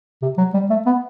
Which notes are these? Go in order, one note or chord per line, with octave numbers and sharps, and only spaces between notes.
C3
F#3
G3
A3
B3